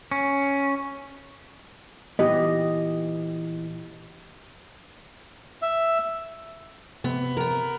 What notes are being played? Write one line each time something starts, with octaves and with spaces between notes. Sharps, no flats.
C#4
A#2 E3 B3 G4 D#5
E5
C3 B3
B3 A#4